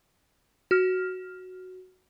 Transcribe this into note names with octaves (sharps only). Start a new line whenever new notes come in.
F#4 F6